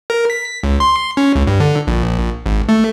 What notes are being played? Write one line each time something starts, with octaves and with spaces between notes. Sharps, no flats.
A#4
B6
C#2
C6
C#4
C#2
G2
D3
A#1
G#1
A3